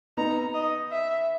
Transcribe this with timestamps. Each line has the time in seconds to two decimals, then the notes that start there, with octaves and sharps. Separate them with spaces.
0.17 B3 D#4 A#5
0.54 D#5
0.91 E5